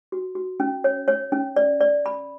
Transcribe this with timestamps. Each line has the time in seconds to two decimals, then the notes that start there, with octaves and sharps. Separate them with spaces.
0.12 F#4
0.35 F#4
0.60 C#4
0.84 C#5
1.08 C#5
1.32 C#4
1.56 D5
1.81 D5
2.06 B5